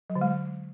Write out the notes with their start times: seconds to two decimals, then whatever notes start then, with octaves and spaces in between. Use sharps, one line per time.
0.10 F#3
0.15 D3
0.21 G#3